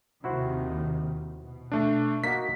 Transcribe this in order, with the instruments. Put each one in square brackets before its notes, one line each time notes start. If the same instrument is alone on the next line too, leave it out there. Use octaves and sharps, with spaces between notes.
[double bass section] D#2 C3 D#3 [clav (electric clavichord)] E4 F#4 C5
[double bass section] B2
[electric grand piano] A3 D4
[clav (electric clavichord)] A#3 D#4 F#4 [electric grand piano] B6